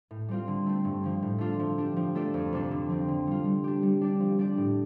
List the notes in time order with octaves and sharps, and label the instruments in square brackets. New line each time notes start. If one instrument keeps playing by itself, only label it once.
[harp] A2
G3 C4 F4
D3
A3 C4
G2
D3 F3
A2
A3 D4 F4 A4
F3
D4 G4
F3
A3 F4 A4 D5
F2
C3 F3 D4 A4
D3
F3 C4
D3
G3 F4
G3
D4 G4
G3
D4 G4 D5
F3
D4 G4 D5
A2